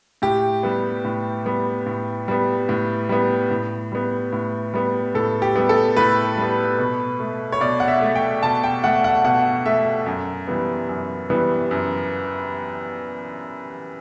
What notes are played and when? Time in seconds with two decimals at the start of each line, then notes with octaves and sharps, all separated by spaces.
0.22 A2 G4
0.63 G3 B3
1.05 A2
1.46 G3 B3
1.86 A2
2.28 G3 B3
2.69 A2
3.09 G3 B3
3.51 A2
3.92 G3 B3
4.33 A2
4.74 G3 B3
5.15 A2 A4
5.42 G4
5.56 G3 B3
5.69 A4
5.97 A2 B4
6.37 G3 B3
6.79 B2
7.19 A3
7.52 C#5
7.61 B2 D5
7.80 F#5
7.88 E5
8.01 A3
8.15 G5
8.42 B2 A5
8.63 G5
8.84 A3 F#5
9.04 F#5
9.25 B2 F#5
9.66 A3 E5
10.06 F#2
10.48 E3 G3 B3
10.89 F#2
11.30 E3 G3 B3
11.71 F#2